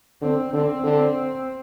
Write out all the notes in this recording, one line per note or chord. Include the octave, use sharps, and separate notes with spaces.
D3 C4
D3 C4
D3